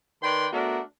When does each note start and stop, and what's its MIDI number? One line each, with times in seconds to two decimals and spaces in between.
0.23 0.47 51
0.23 0.47 71
0.23 0.47 74
0.23 0.47 79
0.23 0.47 83
0.23 0.47 84
0.53 0.80 57
0.53 0.80 59
0.53 0.80 62
0.53 0.80 66
0.53 0.80 70